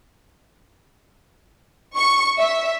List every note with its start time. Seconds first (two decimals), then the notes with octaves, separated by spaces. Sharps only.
1.97 C#6
2.39 E5